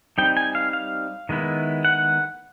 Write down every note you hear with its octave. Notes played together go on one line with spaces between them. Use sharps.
G3 C4 D#4 G5
G#5
F5
F5
D#3 G#3 B3 E4
F#5